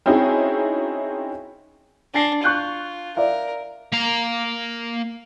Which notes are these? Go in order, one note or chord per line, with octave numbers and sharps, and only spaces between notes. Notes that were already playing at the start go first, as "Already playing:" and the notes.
C4 C#4 D#4 E4 F#4 G#4
D4 G#5 A#6 C7
F4 C#6 F#6 G6
A#4 D5 E5 F5
A#3 A#5